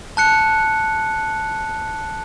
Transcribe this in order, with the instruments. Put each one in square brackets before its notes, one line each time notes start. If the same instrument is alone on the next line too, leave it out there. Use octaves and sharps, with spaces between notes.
[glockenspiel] A5 F#6 C#7